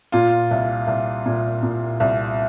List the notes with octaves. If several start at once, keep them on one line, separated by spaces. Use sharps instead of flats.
A#2 F4
C2
C2
A#2
A#2
C2